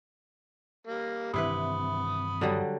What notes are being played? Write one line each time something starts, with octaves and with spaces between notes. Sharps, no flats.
G3 A#3
G2 C3 D#3 E3 E4 B4 B5 D#6
D3 F#3 G3